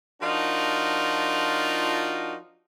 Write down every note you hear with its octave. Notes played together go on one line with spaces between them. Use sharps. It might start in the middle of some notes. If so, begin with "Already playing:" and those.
F3 D4 D#4 F4 F#4 A#4